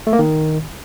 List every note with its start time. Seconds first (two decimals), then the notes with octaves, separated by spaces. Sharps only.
0.07 A3
0.13 A#3
0.19 D#3